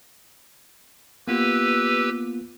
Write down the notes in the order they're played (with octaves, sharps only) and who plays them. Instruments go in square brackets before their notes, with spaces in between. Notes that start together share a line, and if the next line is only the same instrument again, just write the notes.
[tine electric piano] A#3 B3 F4 [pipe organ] G4 B4 E6